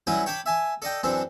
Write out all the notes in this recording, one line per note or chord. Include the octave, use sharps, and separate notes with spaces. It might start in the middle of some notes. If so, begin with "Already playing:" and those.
F#3 G3 C#4 E4 F#4 B4
C#5 G5 A5 B5 D6
E5 G#5 A5
A4 D5 D#5 G5
F#2 E3 C4 D4 A4